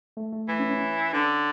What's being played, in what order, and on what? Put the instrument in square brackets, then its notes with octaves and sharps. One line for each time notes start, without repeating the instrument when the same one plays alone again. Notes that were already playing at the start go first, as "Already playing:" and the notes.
[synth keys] A3
A3
[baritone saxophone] E3 [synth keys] A3
[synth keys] C#4
C#4
C#4
[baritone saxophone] D3 [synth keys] D4